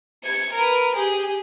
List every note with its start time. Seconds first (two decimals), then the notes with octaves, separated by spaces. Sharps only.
0.23 G#6 C#7
0.53 A#4 B4
0.96 G4 G#4